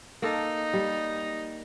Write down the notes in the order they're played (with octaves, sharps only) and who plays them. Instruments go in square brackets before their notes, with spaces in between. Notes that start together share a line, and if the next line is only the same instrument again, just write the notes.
[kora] A#3 A4 A#4 [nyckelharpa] D#4
[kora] G3